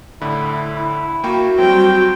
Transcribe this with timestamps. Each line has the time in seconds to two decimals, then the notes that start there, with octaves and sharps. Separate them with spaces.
0.21 A2 D3 E4
0.76 E4
1.24 A#3 F#4 G5 C#6
1.59 F#3 G3 C4 G5